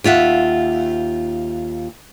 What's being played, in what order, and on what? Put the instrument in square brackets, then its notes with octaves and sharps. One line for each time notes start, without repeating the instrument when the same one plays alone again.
[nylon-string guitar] D#2 F4 E5 F#5